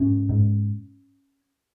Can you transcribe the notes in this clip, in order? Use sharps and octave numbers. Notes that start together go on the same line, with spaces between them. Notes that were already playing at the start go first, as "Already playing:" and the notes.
Already playing: G#2 C#4
G#2